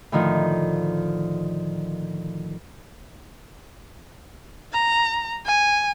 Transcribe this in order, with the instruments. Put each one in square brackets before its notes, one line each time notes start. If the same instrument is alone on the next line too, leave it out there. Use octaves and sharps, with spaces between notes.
[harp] A2 D3 D#3 F3
[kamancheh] A#5
G#5